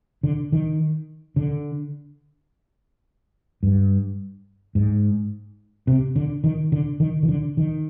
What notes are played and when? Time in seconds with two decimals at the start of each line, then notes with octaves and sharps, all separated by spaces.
0.23 D3
0.52 D#3
1.36 D3
3.63 G2
4.75 G#2
5.87 C3
6.16 D3
6.44 D#3
6.72 D3
7.00 D#3
7.23 D#3
7.28 D3
7.57 D#3